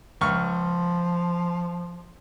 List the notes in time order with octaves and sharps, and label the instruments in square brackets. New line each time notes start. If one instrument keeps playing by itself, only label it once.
[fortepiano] C#2 C#6 F6 [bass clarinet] F3